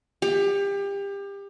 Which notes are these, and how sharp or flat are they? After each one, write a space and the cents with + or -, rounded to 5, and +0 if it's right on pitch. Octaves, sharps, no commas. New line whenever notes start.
G4 +30